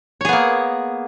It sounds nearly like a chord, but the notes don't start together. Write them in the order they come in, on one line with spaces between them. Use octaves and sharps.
C#5 G#4 B3 A#3